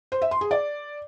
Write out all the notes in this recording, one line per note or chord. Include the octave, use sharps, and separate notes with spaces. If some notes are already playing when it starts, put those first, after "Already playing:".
C5
E5
C6
G#4
D5